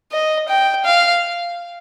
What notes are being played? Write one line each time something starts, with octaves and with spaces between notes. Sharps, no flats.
D#5
G5
F5